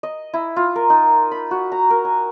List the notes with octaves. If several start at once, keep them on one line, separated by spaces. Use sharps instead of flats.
D#5
E4
F4
A#4
D#4
B5
F#4
A#5
A#4
G#5